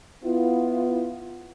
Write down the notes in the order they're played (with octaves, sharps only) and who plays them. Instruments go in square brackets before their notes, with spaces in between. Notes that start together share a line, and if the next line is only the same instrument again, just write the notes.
[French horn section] B3 E4 F4